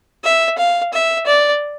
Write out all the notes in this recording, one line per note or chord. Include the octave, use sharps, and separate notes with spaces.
E5
F5
E5
D5